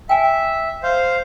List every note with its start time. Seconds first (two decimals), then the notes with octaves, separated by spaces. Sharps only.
0.09 E5 G5 G#5
0.83 C5 F5